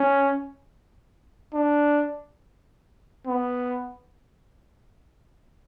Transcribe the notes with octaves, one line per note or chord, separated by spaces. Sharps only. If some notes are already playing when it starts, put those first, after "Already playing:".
Already playing: C#4
D4
B3